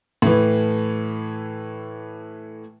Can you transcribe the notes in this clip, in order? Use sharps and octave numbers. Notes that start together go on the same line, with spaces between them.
A2 E3